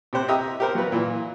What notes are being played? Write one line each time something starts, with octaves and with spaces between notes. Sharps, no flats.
C3 G4 C5 F#6
G4 D#5 E5 G5 A#5 D#6
G4 A#4 C5
F#3 F4 B4
A#2 E3